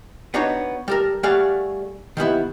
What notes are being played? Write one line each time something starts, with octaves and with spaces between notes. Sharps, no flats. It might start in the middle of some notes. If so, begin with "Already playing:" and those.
B3 D4 D#4 F#4 C#5
G3 A4 A#4
G3 A3 F#4 G#4 D5 F5
D#3 G3 B3 E4